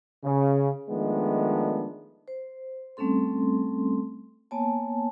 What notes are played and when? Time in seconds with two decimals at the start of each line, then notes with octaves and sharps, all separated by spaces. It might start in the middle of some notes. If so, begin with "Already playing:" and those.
0.24 C#3
0.90 D#3 F3 G#3 A3 B3 D4
2.28 C5
2.97 G3 A3 C4 C#4 A4 C6
4.51 A#3 B3 C#5 G#5 A5